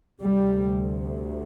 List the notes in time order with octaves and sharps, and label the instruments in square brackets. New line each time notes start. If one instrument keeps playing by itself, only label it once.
[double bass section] D2 C3 G3